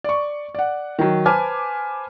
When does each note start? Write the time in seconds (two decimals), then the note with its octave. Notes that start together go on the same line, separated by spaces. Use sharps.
0.04 D5 C#6
0.55 D5 F#5
0.99 D#3 F#3
1.26 B4 C5 G#5 A5 D6 F6